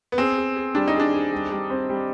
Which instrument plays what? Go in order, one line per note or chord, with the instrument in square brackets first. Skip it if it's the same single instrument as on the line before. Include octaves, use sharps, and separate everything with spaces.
[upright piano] B3
[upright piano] C4 [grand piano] G#4
[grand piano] G#4
G#4
[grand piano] G3 [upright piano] D4
[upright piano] D#4
[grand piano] G#4
[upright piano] D4
[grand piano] G#4
G3
G3
C4
G3